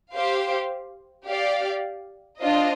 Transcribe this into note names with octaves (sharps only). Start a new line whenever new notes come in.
G4 C5 F5
G4 D5 F5
D4 F4 C5 D#5